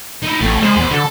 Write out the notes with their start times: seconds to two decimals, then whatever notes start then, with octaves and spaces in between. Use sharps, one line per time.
0.23 D#4 E4
0.41 A1 A3 C4
0.62 G#3 C5 B5
0.76 E2
0.91 D3 A4